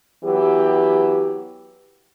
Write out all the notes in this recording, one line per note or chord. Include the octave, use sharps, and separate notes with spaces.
E3 F#3 B3 G4